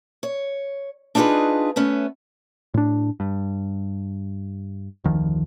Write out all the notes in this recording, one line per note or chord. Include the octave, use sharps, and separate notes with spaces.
C#5
D4 D#4 F4 G4 G#4 B4
A3 B3 C#4
A2 D4
G2
F1 D2 D#3 F3